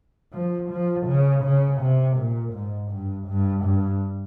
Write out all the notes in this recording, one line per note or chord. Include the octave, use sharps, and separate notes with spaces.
F3
F3
C#3
C#3
C3
A#2
G#2
G2
G2
G2